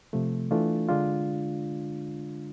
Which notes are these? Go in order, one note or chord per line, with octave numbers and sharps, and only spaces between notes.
C3 F3 A3
E3 A3 D4 F4
D3 G#3 D4 F4